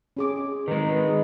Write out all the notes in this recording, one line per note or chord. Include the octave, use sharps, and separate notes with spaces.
C#4 G#4 D6
D#3 G#3 D#4 B4